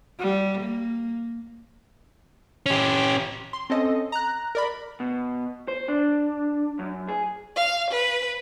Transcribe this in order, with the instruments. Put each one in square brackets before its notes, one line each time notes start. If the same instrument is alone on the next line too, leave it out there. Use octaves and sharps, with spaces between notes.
[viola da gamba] G3
A#3
[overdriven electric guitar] C#4 G4
[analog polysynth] C6
C4 C#4 A4 D#5
A#5 F#6
A#4 D5 B5
[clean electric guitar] B2
C5
D4
F#2
G#4
[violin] F5
B4